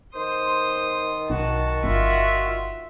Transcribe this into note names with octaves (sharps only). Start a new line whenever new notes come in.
D#3 C5 C6 D#6
B1 F#4 A5
G1 F4 E5